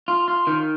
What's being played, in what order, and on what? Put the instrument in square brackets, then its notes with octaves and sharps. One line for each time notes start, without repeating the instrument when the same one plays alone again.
[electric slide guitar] F4
F4
D#3